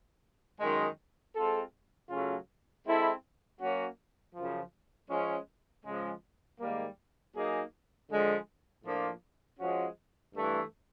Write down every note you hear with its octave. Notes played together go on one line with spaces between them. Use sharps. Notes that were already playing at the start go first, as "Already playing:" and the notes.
F#2 D#3 G#3
G#3 C4 F4 A4
C#3 F#3 A3 C#4 F4
G#3 C4 E4 A4
F#3 A#3 C#4 F#4
F#2 C#3 F3
F3 G#3 C#4
C#3 F3 G#3
G#2 D#3 G3 A#3
F#3 A#3 D#4 G#4
D3 F3 G#3
A2 F3 A#3 D4 F4
F3 G#3 C#4 F#4
G2 E3 A3